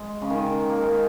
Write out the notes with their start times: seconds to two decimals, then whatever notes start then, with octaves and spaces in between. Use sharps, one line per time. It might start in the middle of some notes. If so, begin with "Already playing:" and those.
Already playing: G#3
0.22 C#3
0.30 D#3
0.70 A#3
0.82 G#3